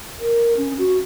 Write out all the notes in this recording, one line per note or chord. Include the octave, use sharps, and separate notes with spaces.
A#4
C#4
F#4